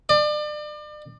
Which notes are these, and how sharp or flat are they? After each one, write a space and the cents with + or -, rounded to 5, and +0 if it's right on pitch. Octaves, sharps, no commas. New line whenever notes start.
D5 +35